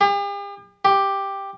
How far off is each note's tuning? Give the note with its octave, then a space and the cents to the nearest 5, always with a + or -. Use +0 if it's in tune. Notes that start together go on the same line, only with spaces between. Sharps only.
G4 +45
G4 +5